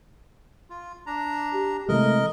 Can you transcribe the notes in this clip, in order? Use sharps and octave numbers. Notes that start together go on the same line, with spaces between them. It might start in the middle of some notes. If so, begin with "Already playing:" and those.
F4
D4 A#5
G4
C3 E3 G#3 A3 A#4 D#5